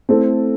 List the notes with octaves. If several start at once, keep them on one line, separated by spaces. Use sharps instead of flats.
A3 C4 E4 A4